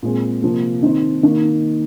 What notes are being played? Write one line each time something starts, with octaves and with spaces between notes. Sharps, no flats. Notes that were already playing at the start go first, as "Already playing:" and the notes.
A#2 G#3 C4
C3 F3 A#3
D#3 C4 D#4
D#3 A#3 D#4